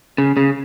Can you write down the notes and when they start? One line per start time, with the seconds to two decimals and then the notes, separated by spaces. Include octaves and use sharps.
0.18 C#3
0.37 C#3